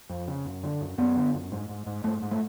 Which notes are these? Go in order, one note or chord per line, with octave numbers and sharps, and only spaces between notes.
F2
C#3
F#2
D3
F#2
F#2 B3
D3
F#2
G#2
G#2
G#2
G#2 A3
G#2
A3